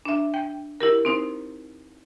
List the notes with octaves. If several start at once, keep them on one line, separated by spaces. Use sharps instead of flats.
D4 E5
G5
E4 G4 A#4
C4 D#4 C5